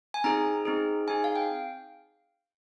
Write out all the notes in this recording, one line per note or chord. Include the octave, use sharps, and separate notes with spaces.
G#5
C4 D#4 G#4 A#5
C4 D#4 G#4
C4 D#4 G#4 G#5
F5
G5